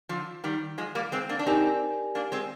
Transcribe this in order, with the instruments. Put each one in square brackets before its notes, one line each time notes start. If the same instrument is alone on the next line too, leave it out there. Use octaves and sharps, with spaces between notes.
[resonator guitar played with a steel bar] D3 F3
D#3 G3
F3 G#3
G3 A#3
G#3 C4
A#3 D4
D4
[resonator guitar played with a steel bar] C4 D#4 [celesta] G4 A#4 D5 G#5
[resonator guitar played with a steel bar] A#3 D4
G#3 C4